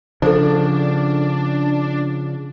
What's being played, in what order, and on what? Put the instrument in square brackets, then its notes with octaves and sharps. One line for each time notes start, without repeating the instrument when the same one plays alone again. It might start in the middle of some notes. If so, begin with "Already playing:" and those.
[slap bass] C#3 F3 [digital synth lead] D4 [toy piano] A4 C5